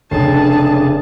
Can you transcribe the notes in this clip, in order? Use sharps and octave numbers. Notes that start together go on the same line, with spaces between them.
F1 C#3 D4 G#4 C#5 A5 C7